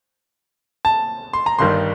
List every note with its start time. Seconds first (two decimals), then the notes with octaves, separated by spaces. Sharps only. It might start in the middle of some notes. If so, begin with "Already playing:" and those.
0.85 A5
1.33 C6
1.46 A#5
1.59 G1 G2 D#3 G3 C6